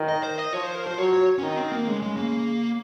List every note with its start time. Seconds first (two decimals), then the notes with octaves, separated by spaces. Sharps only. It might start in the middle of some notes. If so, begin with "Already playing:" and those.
Already playing: D#3
0.09 D#5
0.23 C5
0.38 D#5
0.53 F3 C#5
0.63 C5
0.75 A#4
0.87 C5
0.98 F#3 C#5
1.13 C#5
1.38 C#4
1.42 D#3 D#4
1.57 C4
1.72 A#3
1.87 C#3 G#3
2.02 G#3
2.17 A#3